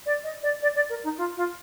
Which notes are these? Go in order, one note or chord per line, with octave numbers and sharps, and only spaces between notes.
D5
D#5
D5
D5
D5
A#4
D#4
F4
F4